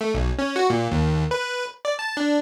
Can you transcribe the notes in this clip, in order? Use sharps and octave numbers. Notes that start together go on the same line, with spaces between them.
A3
B1
C#4
F#4
A#2
D#2
B4
D5
A5
D4